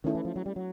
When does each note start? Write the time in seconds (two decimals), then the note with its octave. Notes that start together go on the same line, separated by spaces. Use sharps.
0.04 D#3 A3 C#4 E4 A4
0.15 E3
0.25 F3
0.36 F#3
0.46 G3
0.56 F#3